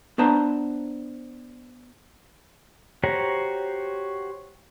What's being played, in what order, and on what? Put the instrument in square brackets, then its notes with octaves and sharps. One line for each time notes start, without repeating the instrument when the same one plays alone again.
[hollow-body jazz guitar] B3 D4 B4 C5 A5 A#5
[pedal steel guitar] F#4 G4 C5 C#5 A#5